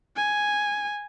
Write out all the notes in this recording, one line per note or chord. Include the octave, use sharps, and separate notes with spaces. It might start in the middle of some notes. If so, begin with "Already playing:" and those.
G#5